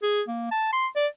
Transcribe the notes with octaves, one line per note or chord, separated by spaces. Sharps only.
G#4
A#3
A5
C6
D5